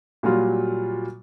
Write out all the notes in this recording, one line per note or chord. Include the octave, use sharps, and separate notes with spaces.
A#2 F#3 G3 F4